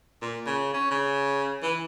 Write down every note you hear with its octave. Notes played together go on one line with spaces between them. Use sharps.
A#2
C#3
C#4
C#3
E3